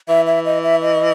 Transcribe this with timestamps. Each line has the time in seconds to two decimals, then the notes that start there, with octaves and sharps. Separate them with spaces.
0.09 E3 E5
0.27 E5
0.45 D#5
0.63 E5
0.82 D#5